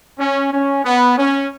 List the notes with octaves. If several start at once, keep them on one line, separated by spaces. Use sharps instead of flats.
C#4
C#4
B3
C#4